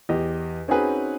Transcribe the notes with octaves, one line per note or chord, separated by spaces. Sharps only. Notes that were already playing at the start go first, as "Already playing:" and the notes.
E2 G4 D#5
C4 C#4 D#4 F#4 G#4 B4